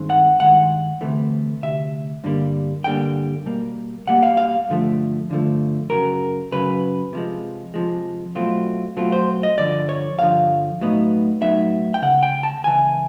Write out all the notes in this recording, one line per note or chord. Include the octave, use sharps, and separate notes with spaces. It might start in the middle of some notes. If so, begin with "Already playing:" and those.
Already playing: G2 D#3 G#3 C4
F#5
G2 D#3 G#3 F#5
D2 C3 E3 A3
D2 C3 E5
G2 D3 G3 A#3
G2 D3 G3 A#3 G5
B2 G3 A#3
B2 G3 A#3 F#5
F5
F5
G2 D3 F3 A3
G2 D3 F3 A3
F#2 C#3 F#3 A#4
F#2 C#3 F#3 B4
C3 F3 G#3
C3 F3 G#3
B2 F#3 A3 C4 F4
B2 F#3 A3 C4 F4
C5
D#5
G2 D3 F3 D5
C#5
G2 D3 F3 F5
B1 A2 F#3 B3 D#4
B1 A2 F#3 B3 D#4 E5
G5
C#2 C#3 F#5
G5
A5
C#2 C#3 E3 G#5